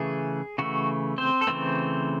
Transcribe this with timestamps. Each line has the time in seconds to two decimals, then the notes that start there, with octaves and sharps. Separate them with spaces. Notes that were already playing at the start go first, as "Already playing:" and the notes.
Already playing: C#3 E3 A3 G#4
0.58 C#3 E3 A3 F#4
1.18 C4 C5
1.41 A4
1.47 C#3 E3 A3 C4 C5